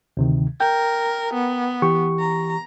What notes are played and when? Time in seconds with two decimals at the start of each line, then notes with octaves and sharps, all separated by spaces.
0.17 D2 C3 D#3
0.60 A#4 G5
1.35 B3
1.82 E3 G4 C#6
2.19 A#5